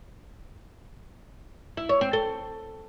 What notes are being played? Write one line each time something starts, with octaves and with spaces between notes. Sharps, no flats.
E4
C#5
C4
A4